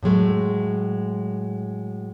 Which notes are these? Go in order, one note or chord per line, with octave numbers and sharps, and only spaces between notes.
A2 F#3 G#3 A3